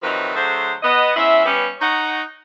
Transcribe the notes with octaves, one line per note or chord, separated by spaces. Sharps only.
C3 D#3 F3 F#3 D#4 B4
D3 F#3 A3 G#4 C5
B3 D#5
E2 C#4 E4 C5 E5
G3 B3 C#4
D#4 C#5 F#5